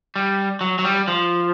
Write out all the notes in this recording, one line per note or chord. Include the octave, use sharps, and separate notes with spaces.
G3
F#3
F#3
G3
F3